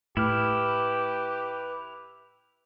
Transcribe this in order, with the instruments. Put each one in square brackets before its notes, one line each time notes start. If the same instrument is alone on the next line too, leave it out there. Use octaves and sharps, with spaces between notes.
[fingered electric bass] A2 [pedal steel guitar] E4 F6 [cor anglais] G4 [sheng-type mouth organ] B4